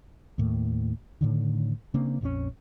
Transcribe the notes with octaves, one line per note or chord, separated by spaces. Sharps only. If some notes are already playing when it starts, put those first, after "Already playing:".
D#2 A2 A#3
A2 D3 D#3
C#3 A#3 C4 D4
A#1 F2 C#3 C#4